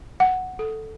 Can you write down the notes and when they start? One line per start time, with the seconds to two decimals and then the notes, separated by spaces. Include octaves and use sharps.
0.20 F#5
0.59 A4